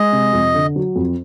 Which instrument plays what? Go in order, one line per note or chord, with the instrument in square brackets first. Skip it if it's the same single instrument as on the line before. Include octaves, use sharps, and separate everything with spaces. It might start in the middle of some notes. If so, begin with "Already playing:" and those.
Already playing: [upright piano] G#3 [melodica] D#5
[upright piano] C3
F2
D3
F#3
F2